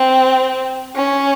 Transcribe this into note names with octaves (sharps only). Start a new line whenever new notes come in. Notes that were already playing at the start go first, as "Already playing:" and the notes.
Already playing: C4
C#4